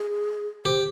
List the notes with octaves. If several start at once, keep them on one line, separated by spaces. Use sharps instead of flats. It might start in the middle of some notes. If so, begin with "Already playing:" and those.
Already playing: G#4
G4 C5